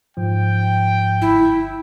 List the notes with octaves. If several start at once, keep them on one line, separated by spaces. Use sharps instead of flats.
G#2 F3 G5
G1 E4